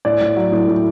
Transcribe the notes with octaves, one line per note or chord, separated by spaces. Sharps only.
A2 D5
A2
F#3
A2
A2